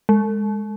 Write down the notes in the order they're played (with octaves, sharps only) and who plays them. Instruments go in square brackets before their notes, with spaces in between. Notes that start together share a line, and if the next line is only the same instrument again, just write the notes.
[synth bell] G#3